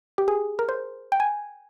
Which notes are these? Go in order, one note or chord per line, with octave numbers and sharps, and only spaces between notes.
G4
G#4
A#4
C5
G5
G#5